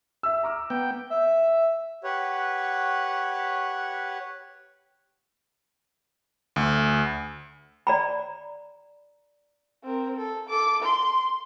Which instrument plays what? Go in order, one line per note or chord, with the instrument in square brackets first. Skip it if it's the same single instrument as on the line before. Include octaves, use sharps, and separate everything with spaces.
[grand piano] E5 E6
A#5 D6 F6
[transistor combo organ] B3 G5
[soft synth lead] E5
[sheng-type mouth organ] G4 B4 C#5 F#5
[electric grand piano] D2
[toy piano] D5 A#5 B5
[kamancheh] C4 A#4
A4
A4 D6
C6